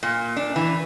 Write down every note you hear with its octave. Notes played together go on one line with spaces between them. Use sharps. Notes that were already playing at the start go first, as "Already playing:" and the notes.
A#2
D4
E3